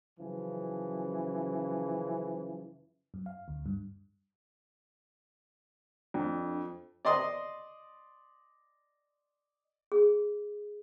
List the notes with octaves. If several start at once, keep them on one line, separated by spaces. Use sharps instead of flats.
F#2 C#3 E3 F3
F#2
F5
D2
G2
F2 D4
D5 D#5 C6 D#6
G#4